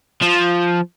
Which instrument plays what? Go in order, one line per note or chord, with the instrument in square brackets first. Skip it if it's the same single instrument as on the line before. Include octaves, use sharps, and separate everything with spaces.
[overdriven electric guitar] F3